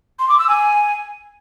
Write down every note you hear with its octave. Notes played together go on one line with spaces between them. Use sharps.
C6
D6
E6
G#5